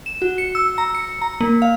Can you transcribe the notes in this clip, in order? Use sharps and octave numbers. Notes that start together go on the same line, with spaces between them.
E7
F#4
C#7
E6
A#5
C#7
A#5
A#3
F5